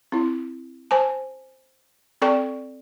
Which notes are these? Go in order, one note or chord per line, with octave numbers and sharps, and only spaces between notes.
C4 E4
C5 G#5 A5
C4 A4 D5 G5 C#6